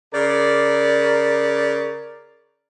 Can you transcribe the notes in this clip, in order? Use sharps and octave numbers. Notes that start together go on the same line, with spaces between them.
C#3 A#4 D5